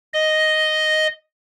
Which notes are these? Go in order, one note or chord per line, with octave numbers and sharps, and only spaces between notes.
D#5